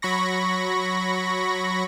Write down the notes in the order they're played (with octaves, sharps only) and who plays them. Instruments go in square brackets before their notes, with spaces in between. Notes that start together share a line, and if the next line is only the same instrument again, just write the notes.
[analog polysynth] F#3 B5 C#6 A#6